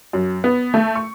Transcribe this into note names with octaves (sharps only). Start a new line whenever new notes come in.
F#2
B3
A3
C#6